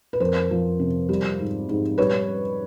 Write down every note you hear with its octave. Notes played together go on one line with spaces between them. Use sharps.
B4
F2 A#4 C5
F3
C3
G3
G#2
G#2
G3 B4 C#5